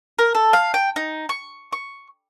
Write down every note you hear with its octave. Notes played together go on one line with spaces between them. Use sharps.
A#4
A4
F5
G5
D#4
C#6
C#6